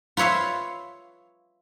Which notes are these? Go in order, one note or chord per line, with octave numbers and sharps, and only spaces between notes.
F4 B4 C#5 E5 F5